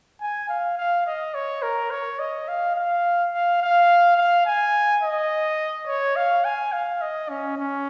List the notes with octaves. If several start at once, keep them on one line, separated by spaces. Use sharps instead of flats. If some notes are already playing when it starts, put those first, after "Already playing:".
G#5
F5
F5
D#5
C#5
A#4
C#5
D#5
F5
F5
F5
F5
F5
G#5
D#5
C#5
F5
G#5
F5
D#5
C#4
C#4